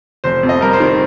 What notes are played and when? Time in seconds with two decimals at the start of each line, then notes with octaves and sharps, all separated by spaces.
0.24 F1 C5
0.43 F2
0.49 D#5
0.61 G3 A#4
0.73 C5
0.80 D#3